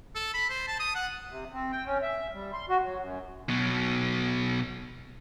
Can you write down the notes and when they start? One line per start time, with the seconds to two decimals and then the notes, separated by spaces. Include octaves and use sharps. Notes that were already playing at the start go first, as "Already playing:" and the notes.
0.15 A4
0.34 B5
0.50 C5
0.68 A5
0.80 D#6
0.95 F#5
1.29 C3
1.53 C4
1.72 G5
1.86 C#4
2.02 E5
2.33 G3
2.53 C6
2.69 F#4
2.83 F#3
3.00 F#2
3.49 B2 F#3